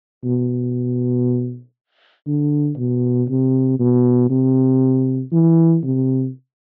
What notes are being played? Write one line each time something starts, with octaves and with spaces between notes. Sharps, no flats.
B2
D3
B2
C3
B2
C3
E3
C3